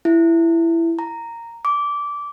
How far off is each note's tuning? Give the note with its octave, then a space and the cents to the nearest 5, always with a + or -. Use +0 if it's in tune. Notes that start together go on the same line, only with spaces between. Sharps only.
E4 +15
A#5 -10
D6 -15